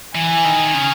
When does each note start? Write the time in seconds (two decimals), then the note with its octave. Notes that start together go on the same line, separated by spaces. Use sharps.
0.14 E3 G#5
0.45 D#3
0.74 C#3